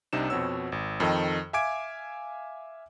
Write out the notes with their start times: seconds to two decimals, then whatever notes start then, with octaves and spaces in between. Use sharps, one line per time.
0.13 C2 C3 D4 D#4 E7
0.30 F2 B2 C4 F#4 C#5 E6
0.72 G#1
1.00 F2 D#3 A4 D#5 G5
1.53 E5 F5 G#5 D6 G#6 D7